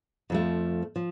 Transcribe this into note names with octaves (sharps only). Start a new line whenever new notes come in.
F2 F3 A3
F3